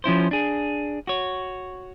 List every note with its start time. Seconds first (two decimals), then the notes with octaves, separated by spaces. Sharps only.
0.04 F3 C#4 E4 C5
0.31 D4 G#4
1.07 F#4 C#5